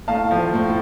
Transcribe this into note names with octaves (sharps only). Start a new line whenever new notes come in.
A2 F5 A5
F3
A2